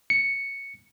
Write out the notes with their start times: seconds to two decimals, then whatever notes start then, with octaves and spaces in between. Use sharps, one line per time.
0.10 C#7